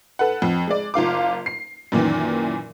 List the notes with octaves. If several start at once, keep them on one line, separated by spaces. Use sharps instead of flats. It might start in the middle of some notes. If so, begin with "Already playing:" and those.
A4 B4 F#5
F2
G#3 D5
F#1 F4 F5 D6
C7
F#2 A#2 D#3 E3